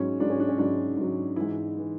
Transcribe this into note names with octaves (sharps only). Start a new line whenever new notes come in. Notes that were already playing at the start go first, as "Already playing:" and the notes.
Already playing: G#2 F#3 C#4
G#2 F#3 D4
C#4
D4
C#4
G#2 F#3 D4
G#2 F#3
G#2 E3 E4
E3